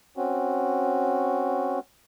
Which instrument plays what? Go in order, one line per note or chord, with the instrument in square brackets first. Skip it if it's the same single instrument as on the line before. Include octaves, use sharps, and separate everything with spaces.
[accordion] C4 C#4 F#4